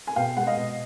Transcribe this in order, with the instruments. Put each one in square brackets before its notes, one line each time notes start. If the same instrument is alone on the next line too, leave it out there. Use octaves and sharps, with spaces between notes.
[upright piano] G#5
B2 F5 G5
G#3 F#5
D#5 F5
B2